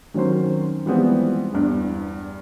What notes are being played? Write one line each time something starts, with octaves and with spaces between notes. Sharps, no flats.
D#3 F#3 C4 C#4 C5
E3 F3 G3 G#3 B3 C4
E2 G2